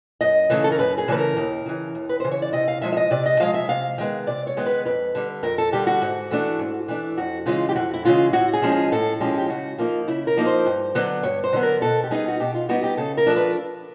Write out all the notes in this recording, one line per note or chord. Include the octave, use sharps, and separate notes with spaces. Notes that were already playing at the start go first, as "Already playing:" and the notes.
F#2 D#5
C#3 E3 A3
A4
A#4
F#2 B4
G#4
C#3 E3 A3 B4
A#4
D#2
C#3 E3
D#2
B4
C#3 E3 C5
C#5
D5
C3 D#5
F5
F3 G#3 E5
E5
D#5
C3 D5
D#5
F3 G#3 F5
E5
C3 F5
D#3 G#3 B3
C3 D5
C#5
D#3 G#3 B3
B4
F2 B4
D3 G3
F2 A#4
A4
D3 G3 G4
F#4
G#2
E3 A3 D4
G#2
E3 A3 D4
F2 F#4
C#3 E3 G#3 F4
G4
F2 F#4
E4
C#3 E3 G#3 F4
A2 F#4
G#4
F3 G#3 C#4
G#4
A2 A4
F3 G#3 C#4 G4
G4
C#3 F#4
F3 A#3 D#4 F4
C#3 E4
A#4
F3 A#3 D#4
C5
G2
D3 F#3 B3
G2 C#5
C5
D3 F#3 B3
A#4
B2 A4
G4
G3 B3 D#4 G#4
F#4
B2 G4
F4
G3 B3 D#4 F#4
G4
C#3 A4
A#4
F3 A3 D4
B4